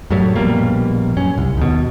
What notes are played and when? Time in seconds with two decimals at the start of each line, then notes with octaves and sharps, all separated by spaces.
0.10 F#2 A2 F#3 G3
0.36 A#1 B2 G3 A#3
1.17 F#2 C#4
1.38 C2
1.57 D#2 B2